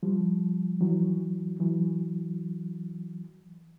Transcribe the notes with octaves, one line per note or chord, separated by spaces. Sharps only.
F3 G3
E3 F#3
E3 F#3